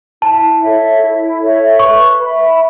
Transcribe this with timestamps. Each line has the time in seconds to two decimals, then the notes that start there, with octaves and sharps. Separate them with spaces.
0.21 E4 A5
0.61 A4 C#5 E5
1.01 E4
1.40 A4 C#5 E5
1.79 B4 C#6
2.19 E5 B5